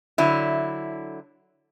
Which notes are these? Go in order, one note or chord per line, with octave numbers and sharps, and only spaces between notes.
D3 F#3 E4